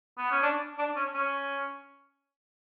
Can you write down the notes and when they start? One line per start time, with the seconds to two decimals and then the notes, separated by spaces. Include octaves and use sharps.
0.18 B3
0.31 C#4
0.43 D4
0.78 D4
0.96 C#4
1.14 C#4